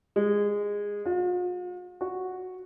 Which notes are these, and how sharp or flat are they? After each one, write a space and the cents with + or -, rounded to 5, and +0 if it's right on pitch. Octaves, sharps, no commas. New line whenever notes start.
G#3 -15
F4 +45
F#4 -5